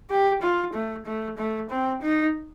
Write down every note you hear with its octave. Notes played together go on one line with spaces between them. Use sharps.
G4
F4
A3
A3
A3
C4
D#4